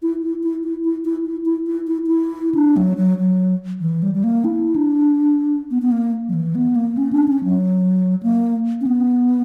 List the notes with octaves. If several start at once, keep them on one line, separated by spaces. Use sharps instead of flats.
E4
E4
E4
E4
E4
E4
E4
E4
E4
E4
E4
D4
F#3
F#3
F#3
E3
G3
G3
A#3
E4
D4
B3
B3
A#3
F#3
E3
B3
A#3
C#4
D4
C#4
F#3
A#3
C#4
B3